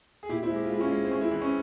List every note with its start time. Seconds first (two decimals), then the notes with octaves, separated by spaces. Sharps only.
0.23 G#4
0.29 A#2 E4 G4
0.43 C4 E4
0.50 G#3
0.56 G4
0.64 F4
0.70 G#3 E4
0.81 C#4 F4
0.91 G#3
1.04 C4
1.11 G#3 C#4
1.21 C4 E4
1.31 E3 C4
1.42 C#4